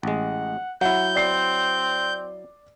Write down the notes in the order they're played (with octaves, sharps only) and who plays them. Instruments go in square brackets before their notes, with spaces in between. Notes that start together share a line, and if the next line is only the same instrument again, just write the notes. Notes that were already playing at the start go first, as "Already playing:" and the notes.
[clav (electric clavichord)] A1 G#3 [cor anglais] F#5
[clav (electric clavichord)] F#3 E4 [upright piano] F#5 [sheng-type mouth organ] G6
[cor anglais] C4 [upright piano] D5 C7